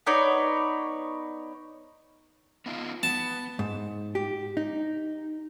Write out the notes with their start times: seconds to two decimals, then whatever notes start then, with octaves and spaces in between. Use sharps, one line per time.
0.07 B3 D#4 C#5 D5
2.66 B3 D#4 F4
3.03 B3 A5
3.59 G#2
4.15 G4
4.57 D#4